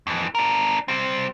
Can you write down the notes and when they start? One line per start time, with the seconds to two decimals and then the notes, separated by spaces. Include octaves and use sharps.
0.07 F2 E3
0.35 D4 A#4
0.88 G3 C4